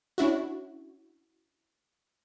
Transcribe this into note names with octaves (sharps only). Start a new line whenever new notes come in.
C#4 D4 E4 F#4